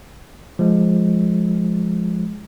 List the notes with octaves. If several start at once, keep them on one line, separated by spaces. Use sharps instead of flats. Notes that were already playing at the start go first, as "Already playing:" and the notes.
F3 G#3